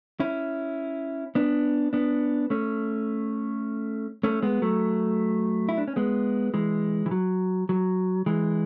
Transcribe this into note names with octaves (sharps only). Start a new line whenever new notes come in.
C#4 E4
B3 D4
B3 D4
A3 C#4
A3 C#4
G#3 B3
F#3 A3
E4
D4
C#4
G#3 B3
E3 G#3
E3
F#3
F#3
E3 G#3